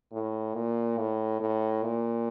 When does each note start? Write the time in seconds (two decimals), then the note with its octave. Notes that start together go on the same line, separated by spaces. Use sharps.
0.12 A2
0.55 A#2
0.98 A2
1.40 A2
1.83 A#2